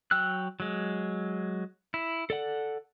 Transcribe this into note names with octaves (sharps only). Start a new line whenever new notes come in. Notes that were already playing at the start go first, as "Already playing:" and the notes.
F#3 G5 E6 F#6
F#3 G#3
E4
A4 D5 F#5